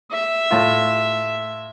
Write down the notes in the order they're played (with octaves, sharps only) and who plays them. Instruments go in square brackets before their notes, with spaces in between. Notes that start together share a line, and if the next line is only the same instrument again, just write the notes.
[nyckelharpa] E5
[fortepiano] A2 F4